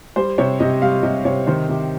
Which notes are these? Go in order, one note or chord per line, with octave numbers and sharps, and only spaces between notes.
G3 C5
C3 C#5
C3 D#5
G3 F5
C3 D#5
C3 C#5
D#3 C5
C3 G4